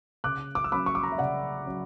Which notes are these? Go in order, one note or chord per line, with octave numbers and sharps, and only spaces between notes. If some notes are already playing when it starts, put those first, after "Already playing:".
C#3 D6 F#6
D6
E6
F#3 C#4 B5 D6
C#6
D6
A#5 C#6
E5
C#3 D5 F#5
F#3 C#4